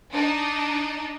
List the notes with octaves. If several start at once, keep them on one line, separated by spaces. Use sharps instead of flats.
D4 D#4 D#5